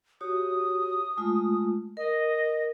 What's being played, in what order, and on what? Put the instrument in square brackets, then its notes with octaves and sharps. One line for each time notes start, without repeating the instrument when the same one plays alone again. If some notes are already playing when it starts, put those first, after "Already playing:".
[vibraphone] F#4 G4 C#5 [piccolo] D#6
[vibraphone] G#3 A3 F4
[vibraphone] A#4 [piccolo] D#5